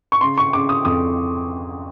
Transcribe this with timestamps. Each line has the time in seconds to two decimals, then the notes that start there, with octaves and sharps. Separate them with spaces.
0.12 C#6
0.21 C#3 C6
0.38 C#6
0.53 C#3 D6
0.69 D#6
0.85 F2 D#6